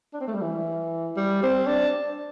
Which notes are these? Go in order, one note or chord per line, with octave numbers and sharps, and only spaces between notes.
D4
C4
A3
G3
E3
G3
C4
D4